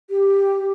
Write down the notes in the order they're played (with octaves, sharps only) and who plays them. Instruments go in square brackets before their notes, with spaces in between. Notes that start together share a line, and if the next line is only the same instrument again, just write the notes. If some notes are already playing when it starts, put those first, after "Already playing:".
[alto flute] G4